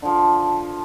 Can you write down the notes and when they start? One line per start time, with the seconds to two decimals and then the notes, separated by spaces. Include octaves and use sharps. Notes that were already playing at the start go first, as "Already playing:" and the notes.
0.02 D3 F3